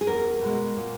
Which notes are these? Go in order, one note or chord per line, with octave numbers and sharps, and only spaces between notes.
G#4
E2 A#4
B2 G#3
A#2